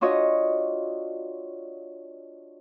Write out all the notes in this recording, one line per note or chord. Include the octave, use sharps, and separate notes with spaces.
D4 F4 F#4 C#5 D#5